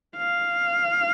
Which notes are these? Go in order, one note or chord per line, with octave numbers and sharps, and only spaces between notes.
F5